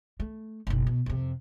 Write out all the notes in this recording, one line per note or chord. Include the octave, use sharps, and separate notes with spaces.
A3
F#1 B1
B2
F2 C3